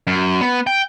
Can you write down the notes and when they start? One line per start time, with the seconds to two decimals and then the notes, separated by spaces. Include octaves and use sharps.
0.07 F#2
0.41 B3
0.67 G5